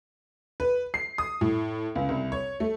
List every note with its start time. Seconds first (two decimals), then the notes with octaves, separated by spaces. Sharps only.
0.60 B4
0.94 C7
1.18 D#6
1.41 A2
1.95 C#2
2.09 C2
2.32 C#5
2.60 A3